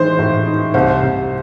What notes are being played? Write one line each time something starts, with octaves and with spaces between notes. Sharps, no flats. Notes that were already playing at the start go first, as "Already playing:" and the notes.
Already playing: A2 E3 G#3 D#4 C5
A2
D#4
C2 C5
C2